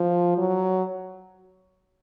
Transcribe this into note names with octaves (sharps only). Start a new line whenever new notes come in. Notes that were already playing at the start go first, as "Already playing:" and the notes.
Already playing: F3
F#3